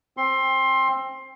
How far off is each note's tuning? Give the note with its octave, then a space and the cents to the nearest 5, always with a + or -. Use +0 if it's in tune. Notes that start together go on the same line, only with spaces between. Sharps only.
C4 +20 C6 +20